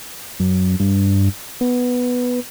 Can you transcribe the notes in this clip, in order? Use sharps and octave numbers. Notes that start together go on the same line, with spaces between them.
F#2
G2
B3